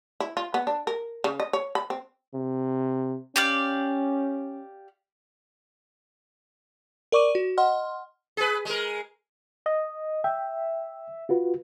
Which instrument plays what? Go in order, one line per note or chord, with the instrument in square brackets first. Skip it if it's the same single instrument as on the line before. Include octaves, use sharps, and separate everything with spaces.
[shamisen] E4
F4
B3
D4
A#4
C#3
D#5
C#5
B5
C4
[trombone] C3
[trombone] C#4 [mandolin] G4 D5 F5
[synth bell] A#4 D5 C#6 D6 D#7
F#4
D#5 F#5 C6 F6
[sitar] G#4 B4
G#3 A#4
[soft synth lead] D#5
[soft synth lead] E5 [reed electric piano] G5
[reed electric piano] F4 F#4 B4